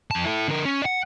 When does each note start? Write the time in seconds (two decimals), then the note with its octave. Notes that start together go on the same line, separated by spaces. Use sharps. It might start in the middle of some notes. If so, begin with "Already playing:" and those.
0.11 F2 A5
0.24 E4 A4
0.48 D3 A#4
0.65 C#4
0.82 D5 F#5